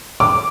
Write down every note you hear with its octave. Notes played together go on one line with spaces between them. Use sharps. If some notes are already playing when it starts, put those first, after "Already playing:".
D6